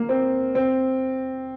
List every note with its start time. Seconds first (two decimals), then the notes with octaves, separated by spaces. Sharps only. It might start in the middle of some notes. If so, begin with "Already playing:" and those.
Already playing: A#3
0.09 C4
0.55 C4